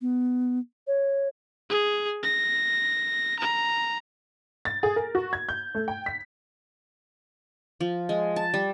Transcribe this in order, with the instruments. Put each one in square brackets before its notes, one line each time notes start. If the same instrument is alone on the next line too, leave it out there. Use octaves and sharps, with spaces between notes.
[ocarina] B3
C#5
[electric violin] G#4
A#6
A#5
[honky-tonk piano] A6
G#4
A#4
F#4
G#6
G6
A3
G5
B6
[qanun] F3
G#3
A5
G3